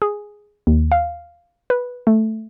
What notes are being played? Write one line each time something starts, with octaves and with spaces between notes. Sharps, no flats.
G#4
D#2
F5
B4
A3